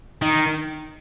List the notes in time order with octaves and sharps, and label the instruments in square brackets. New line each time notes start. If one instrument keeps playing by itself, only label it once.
[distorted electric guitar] D#3